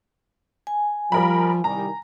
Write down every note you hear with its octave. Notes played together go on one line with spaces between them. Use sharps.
G#5
F3 G3 A#4 B5
C2 D#3 G3 A#5